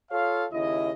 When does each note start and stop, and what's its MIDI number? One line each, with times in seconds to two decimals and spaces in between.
0.10 0.45 65
0.10 0.45 69
0.10 0.45 73
0.10 0.45 77
0.53 0.92 39
0.53 0.92 49
0.53 0.92 64
0.53 0.92 75